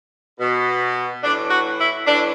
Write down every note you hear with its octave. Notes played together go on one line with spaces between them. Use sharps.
B2
A2 E3 D4
F#4
E4
A2 E3 D4